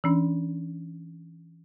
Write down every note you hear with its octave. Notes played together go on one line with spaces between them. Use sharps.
E3 C#4 D4